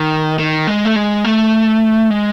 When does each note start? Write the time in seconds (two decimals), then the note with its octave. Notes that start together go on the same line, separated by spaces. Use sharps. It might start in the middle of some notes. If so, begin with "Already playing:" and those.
Already playing: D#3
0.39 D#3
0.67 G#3
0.85 A3
0.96 G#3
1.24 A3
2.10 G#3